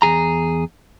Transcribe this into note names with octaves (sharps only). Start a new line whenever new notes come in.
E2 G#2 G#4 A#5